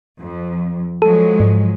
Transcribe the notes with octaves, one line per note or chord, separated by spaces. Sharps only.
F2
F3 F#3 G#3 A4
G#2